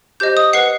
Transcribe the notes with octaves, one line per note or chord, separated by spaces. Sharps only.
G4 C5 D#5 G6
D#6
B4 D#5 F#5 C7